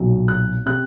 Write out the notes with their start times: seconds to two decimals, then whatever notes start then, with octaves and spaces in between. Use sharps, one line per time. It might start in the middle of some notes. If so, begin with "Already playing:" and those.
Already playing: B1 A#2 F#3
0.28 F#6
0.66 C3 F#6